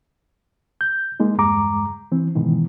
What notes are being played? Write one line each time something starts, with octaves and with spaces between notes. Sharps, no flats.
G6
G#3 A#3 D#4
E2 G2 G#3 A#5 D6
E3 C4
G#2 B2 D#3 E3